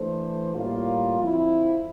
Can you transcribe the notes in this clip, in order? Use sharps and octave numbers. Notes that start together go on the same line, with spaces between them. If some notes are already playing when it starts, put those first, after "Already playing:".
Already playing: E3 A3 D4 A4 C5
A2 G3 A#3 F4
F2 D3 F3 C4 E4